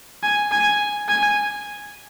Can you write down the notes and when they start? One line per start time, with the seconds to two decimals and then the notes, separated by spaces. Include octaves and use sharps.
0.23 G#5
0.51 G#5
1.08 G#5